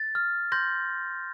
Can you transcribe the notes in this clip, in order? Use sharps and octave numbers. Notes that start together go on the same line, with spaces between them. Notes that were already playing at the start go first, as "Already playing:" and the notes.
Already playing: A6
F6
C6 G6 A#6